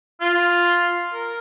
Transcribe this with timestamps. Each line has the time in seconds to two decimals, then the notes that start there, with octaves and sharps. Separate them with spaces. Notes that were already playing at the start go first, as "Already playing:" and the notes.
0.21 F4
1.13 A#4